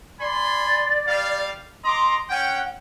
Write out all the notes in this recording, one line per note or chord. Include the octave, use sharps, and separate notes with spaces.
D5 G#5 B5 C6
G3 F5
D#5 A#5 C6 D6
C#4 F#5 G5